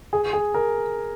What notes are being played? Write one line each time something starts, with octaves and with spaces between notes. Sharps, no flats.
G#4
G#4
A#4